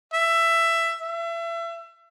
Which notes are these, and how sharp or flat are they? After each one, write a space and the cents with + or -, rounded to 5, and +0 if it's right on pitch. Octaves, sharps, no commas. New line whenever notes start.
E5 +15
E5 +30